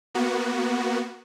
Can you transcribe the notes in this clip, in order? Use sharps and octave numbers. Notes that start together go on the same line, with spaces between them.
A#3 B3 F#4